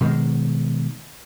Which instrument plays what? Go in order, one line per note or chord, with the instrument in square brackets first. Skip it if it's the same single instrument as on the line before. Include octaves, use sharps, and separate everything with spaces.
[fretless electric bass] B2 D#3 G#3